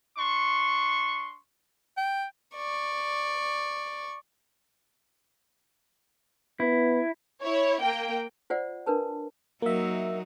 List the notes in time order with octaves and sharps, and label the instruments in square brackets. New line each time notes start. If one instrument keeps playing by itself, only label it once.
[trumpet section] D4 C6 C#6
[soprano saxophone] G5
[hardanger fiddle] D5 C#6
[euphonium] B3 [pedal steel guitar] E4
[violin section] E4 C#5
A#3 G5
[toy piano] F4 C5 D5 F#5
D4 A#4 B4 A5
[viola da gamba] F#3 D#4 [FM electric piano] A#3 E5